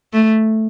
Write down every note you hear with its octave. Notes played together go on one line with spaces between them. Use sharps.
A3